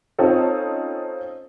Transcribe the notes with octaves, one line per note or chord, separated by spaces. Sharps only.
C4 C#4 D#4 F4 A4